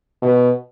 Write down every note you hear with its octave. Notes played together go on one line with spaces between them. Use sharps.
B2